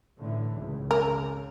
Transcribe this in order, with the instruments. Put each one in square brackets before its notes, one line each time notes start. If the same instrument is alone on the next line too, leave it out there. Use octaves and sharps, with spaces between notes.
[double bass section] A2 D3 E3
G#1 C#2
[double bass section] C#3 [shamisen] A#4